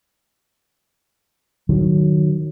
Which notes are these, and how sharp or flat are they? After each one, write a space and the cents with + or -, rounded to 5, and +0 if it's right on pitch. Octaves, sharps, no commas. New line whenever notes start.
D#3 -30 F#3 +0